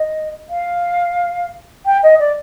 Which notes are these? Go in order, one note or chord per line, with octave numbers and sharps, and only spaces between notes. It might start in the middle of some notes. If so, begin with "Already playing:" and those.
Already playing: D#5
F5
G5
D#5
D5